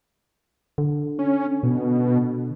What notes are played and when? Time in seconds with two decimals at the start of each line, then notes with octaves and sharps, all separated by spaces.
0.78 D3
1.19 C#4
1.63 B2